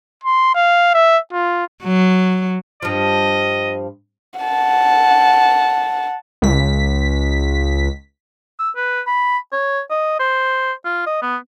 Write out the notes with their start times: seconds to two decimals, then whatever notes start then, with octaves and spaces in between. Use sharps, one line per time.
0.24 C6
0.55 F5
0.94 E5
1.33 F4
1.83 F#3
2.82 G2 F3 D#5
4.40 F#5 A5
6.42 C#2 B6
8.59 E6
8.76 B4
9.07 B5
9.53 C#5
9.91 D#5
10.19 C5
10.85 F4
11.06 D#5
11.22 B3